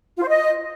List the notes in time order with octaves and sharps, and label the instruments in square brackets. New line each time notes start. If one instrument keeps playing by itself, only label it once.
[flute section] F4
C5
D#5